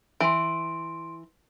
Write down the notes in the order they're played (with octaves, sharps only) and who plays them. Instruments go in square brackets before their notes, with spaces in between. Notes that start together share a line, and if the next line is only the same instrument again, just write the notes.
[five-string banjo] E3 [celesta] C6 D7